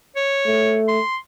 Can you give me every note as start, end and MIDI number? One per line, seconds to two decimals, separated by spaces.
0.16 0.79 73
0.46 0.99 57
0.88 1.17 84